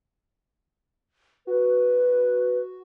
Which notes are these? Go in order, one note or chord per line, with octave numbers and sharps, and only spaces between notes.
F#4 B4